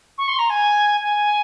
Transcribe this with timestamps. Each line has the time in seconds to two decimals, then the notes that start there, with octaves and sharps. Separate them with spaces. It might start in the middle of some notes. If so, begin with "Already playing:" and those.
0.18 C#6
0.28 C6
0.38 A#5
0.49 G#5
1.01 G#5